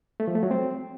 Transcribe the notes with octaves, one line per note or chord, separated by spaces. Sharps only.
A3
F3
A3
F#3
C4